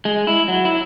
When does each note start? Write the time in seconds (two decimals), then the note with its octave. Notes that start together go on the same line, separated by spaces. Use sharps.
0.05 G#3
0.27 E4
0.48 F#3
0.65 E4